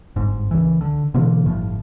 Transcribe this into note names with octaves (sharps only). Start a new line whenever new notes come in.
G1 G#2
C#2 E3
D3
B2 D3 E3 A#3
G1 A2 F3